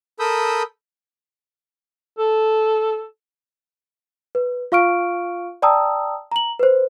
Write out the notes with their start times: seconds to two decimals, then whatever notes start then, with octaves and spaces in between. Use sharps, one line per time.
0.20 A4 A#4 B5 D#6 E6 G6
2.19 A4
4.35 B4
4.72 F4 F5 C#6 F6 D7
5.62 D5 G5 A5 A#5 D#6 E6
6.32 A#5 F#7
6.59 B4 C5